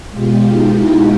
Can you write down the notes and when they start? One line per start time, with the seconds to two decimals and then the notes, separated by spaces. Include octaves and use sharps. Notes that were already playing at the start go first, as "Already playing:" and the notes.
0.11 B2 G#3 F4 G4
0.42 D#4 F4
0.73 E4 F#4